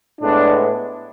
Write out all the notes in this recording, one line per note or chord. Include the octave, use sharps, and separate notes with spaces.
A2 G#3 B3 D4